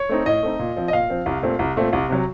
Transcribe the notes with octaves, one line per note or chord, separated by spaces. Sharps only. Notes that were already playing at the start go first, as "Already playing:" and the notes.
Already playing: C#5
A3 C4 D#4
A2 D#5
A3 C4 D#4
A#2
F3 C4
D#5
A#2 F5
F3 C4
C2
A#2 A3 C4
C2
A#2 A3 C4
C2
C3 F#3